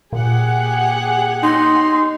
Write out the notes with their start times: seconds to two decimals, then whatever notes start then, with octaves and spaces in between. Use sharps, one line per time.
0.13 A#2 G4 G#4 F#5
1.43 D#4 C6